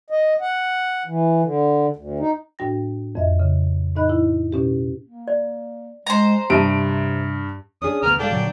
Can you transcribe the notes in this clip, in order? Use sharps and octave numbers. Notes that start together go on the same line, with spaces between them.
D#5
F#5
E3
D3
D2
D#4
A2 D4 F#4 G5 A#6
F2 D#5 E5
C#3
A2 D#4 D#5 B5 F#6
E4
B2 C#4 G4
A#3
D5
G#3 C5 A#5
G2 C3 G4 E5 A5 D7
C#4 D4 G#4 D#6
D2 B3 A#4 D#6 F6
G#2 D4 A4 F5 G5
A#2 D3 F#3